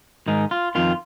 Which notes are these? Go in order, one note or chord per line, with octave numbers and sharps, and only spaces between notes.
G#2 D#3 D#4
F4
F2 D#3 F4